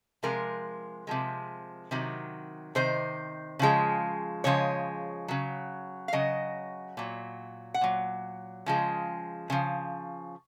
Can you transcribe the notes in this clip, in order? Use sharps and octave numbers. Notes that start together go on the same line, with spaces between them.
C3 F3 G#3 A#4
C3 F3 G#3
C3 D#3 F#3
C3 D#3 C5
C#3 F3 G#3
C#3 F3 G#3 C#5
C#3 F#3
F5
C#3 F#3 D#5
A#2 F#3
F#5
A#2 F#3
C#3 F3 G#3
C#3 F3